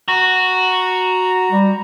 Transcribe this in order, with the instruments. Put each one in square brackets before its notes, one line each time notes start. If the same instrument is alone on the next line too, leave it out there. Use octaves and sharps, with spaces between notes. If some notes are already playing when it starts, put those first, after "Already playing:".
[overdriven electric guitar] F#4 [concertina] A#5
[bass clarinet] G3